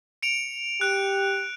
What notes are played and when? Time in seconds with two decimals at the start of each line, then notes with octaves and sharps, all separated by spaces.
0.22 C#7 D7 F7
0.81 G4 F#6 D7